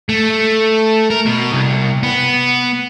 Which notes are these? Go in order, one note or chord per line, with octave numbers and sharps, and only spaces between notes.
A3
A#4
B2
C2
B3